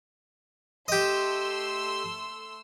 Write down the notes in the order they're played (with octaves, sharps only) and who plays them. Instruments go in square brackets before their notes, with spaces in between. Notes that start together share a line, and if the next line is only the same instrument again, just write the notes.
[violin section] A3 C6 E6 [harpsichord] G4 D#5